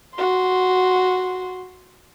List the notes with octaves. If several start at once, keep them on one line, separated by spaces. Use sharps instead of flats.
F#4 C6